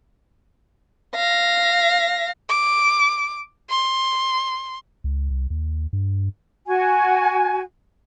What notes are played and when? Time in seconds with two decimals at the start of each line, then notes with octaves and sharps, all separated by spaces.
1.15 F5 A#6
2.49 D6
3.70 C6
5.04 C#2
5.30 C2
5.50 D#2
5.93 G2
6.66 F#4 G#5